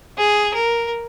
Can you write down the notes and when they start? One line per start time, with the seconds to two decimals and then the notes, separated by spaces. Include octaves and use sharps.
0.18 G#4
0.54 A#4